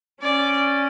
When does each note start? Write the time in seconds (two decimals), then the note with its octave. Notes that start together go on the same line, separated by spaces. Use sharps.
0.21 C#4 D5